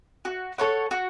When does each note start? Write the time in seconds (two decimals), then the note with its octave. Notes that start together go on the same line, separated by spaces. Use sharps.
0.25 F#4
0.58 A4 C#5 F#5
0.91 F#4